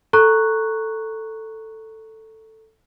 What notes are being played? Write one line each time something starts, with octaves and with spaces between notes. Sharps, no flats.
A4 A#5 C#6 F#6